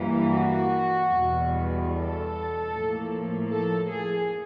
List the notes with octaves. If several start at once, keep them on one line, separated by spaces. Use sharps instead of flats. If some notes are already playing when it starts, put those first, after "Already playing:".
Already playing: G2 E3 G3 A#3
F#4
E2 B2 G3
A4
A2 F3 A#3
A4
G#4